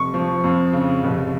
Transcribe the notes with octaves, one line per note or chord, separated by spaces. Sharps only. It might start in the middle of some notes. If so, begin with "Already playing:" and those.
Already playing: F1 C#6
F3
F2
C#3
F1